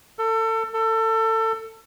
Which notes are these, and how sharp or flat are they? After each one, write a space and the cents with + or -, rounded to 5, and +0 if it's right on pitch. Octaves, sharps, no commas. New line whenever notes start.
A4 +30
A4 +25